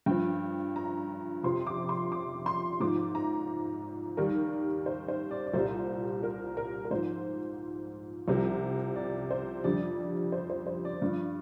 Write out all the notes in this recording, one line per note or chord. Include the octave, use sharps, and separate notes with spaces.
G2 F3 G5
A#5
F2 C3 F3 C6
D6
C6
D6
C6
G#2 F3 D6
A#5
D#2 D#3 G3 A#4
C5
C5
D5
D5
C2 A#2 G3 C5
A#4
A#4
A#4
G#2 F3 C5
C2 C3 F3
D5
C5
F2 D3 G3 D5
C5
C5
C5
D5
G2 F3